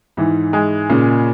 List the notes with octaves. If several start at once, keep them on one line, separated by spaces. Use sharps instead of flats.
G#2 E3
G#3
A#2 C#3